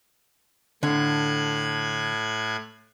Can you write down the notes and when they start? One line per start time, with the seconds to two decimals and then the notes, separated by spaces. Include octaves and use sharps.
0.83 A2 D3 F#6 G#6